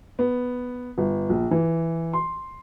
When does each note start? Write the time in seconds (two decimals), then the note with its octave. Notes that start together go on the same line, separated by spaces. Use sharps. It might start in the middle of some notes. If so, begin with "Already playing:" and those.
0.19 B3
0.98 G1
1.29 A#1
1.51 E3
2.13 C6